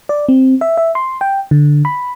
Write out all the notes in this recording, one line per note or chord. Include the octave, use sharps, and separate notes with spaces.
D5
C4
E5
E5
C6
G5
D3
B5